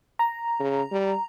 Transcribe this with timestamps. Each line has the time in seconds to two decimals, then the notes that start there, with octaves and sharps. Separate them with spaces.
0.19 A#5
0.60 C#3
0.92 G3